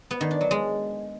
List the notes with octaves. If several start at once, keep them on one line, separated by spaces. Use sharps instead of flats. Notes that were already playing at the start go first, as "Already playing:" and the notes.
B3
D#3
D4
F#3
G#3